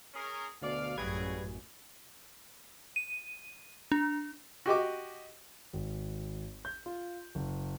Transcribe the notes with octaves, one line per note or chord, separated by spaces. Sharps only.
C#4 G#4 A#4
D2 B2 D5 F5
A1 F#2 C#3 F#3 G3 G#4 B4 G#6
D#7
D4
F#4 G4 D#5 D6
G#1
G6
F4
F#1